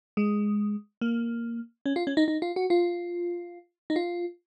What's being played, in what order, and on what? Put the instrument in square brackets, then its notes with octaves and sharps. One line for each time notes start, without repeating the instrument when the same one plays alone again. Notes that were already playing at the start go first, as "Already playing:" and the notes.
[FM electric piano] G#3
A#3
C#4
F4
C#4
D#4
D#4
F4
F#4
F4
D#4
F4